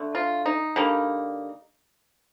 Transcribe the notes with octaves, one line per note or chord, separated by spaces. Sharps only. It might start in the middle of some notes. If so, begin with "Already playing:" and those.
Already playing: D3 A3
F4
D#4
D3 G3 A#3